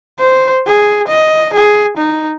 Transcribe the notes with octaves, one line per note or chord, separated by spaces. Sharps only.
C5
G#4
D#5
G#4
D#4